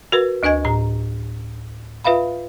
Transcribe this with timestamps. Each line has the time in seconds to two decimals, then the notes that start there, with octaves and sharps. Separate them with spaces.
0.12 F#4 A#4 B4
0.43 D2 D4 D#5 G#5 G#6
0.65 A2 A#5
2.05 F4 B4 E5 F5 B5